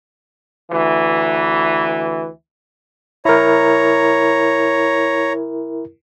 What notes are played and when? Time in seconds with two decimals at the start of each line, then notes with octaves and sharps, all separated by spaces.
0.71 D2 E3
3.25 E4 A#4 C#5 A#5